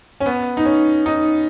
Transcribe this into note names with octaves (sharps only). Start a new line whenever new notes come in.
C#4
B3
D#4
C#4
D#4